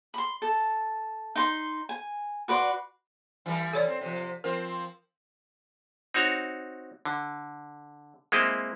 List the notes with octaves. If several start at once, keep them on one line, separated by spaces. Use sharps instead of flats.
B5 C6
A4
D#4 C6
G#5
F#4 B4 D5 C6
E3 G3 A#4
A4 C#5 D5
C4
C3 F3
F3 C4 A#4
C4 D#4 F#4 C#5
D3
G#3 A#3 C4 E4 D#5